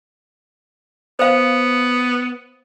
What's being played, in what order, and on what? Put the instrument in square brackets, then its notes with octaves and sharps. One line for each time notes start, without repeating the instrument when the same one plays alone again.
[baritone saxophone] B3 [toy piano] C5 F5